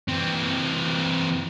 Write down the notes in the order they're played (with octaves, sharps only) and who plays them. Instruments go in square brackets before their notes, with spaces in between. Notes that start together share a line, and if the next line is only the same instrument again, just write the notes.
[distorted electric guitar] E3 C4